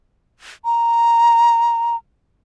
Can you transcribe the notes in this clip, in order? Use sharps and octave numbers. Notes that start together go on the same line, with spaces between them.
A#5